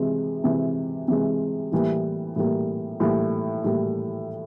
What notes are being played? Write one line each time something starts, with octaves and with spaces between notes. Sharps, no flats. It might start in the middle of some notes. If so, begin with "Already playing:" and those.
Already playing: C3 E3 G#3
C3 E3 G#3
C3 E3 G#3
A2 E3 G3 A#3
A2 E3 G3 A#3
A2 E3 G3 A#3
A2 E3 G3 A#3